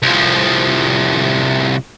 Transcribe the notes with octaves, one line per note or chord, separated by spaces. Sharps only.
C2 F3